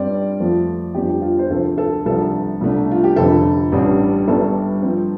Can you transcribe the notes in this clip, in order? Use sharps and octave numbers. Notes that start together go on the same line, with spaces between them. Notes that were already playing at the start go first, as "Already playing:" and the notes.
Already playing: G2 G3 C4 D5
F2 F3 A3
G1 F2 F3 D4 G4
F4
C5
D2 C3 F3 A4
A4
C2 C3 F3 D4 A4
C2 C3 A3 D4
F4
G4
F1 F2 D3 A4
A1 G2 G3 D4
G1 G2 G3 D4 A4
G2 F3 C4